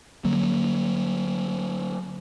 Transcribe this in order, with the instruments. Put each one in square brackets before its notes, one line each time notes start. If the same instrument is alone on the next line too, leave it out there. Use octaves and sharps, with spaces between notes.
[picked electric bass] D3 F#3 A#3